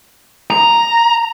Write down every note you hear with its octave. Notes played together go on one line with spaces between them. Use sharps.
A#5